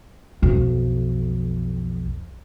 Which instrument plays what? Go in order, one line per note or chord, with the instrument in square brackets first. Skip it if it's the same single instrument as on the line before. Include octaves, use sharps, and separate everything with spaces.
[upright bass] B1 F2